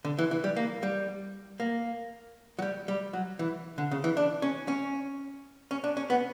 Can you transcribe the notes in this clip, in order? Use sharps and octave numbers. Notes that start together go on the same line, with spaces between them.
D3
E3
E3
G3
A#3
G3
A#3
F#3
G3
G3
F#3
E3
D3
C#3
E3
D4
C#4
C#4
C#4
D4
C#4
B3